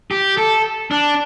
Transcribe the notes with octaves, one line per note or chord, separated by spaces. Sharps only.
G4
A4
D4